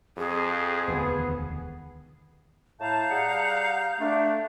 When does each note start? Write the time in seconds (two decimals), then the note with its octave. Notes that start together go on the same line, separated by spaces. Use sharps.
0.17 F2 G#4
0.88 E1 D2 D#3 B3
2.80 A2 F5 A5 A#5 G6
3.10 G3 G#4 F#5
4.00 A3 D4